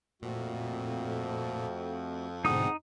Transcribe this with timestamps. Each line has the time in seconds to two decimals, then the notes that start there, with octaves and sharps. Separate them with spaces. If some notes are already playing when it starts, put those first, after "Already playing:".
0.22 F2 A#2 A3 C4 F#4
2.45 G#2 B2 D3 C4 D#4 G#4 F#5 D#6